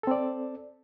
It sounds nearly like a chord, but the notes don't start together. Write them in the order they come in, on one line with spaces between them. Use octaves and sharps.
A4 C4 D5